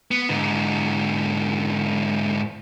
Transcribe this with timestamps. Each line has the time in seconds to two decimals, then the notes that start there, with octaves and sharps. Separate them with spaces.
0.11 B3
0.29 G#2 D3